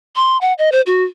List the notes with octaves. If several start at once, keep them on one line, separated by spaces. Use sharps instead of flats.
C6
F#5
D#5
C5
F#4